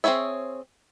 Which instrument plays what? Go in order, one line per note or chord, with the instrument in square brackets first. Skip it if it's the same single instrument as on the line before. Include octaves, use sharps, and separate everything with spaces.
[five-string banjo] C4 E4 G#4 C#5 E5